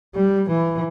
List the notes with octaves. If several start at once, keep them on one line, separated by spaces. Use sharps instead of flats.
G3
E3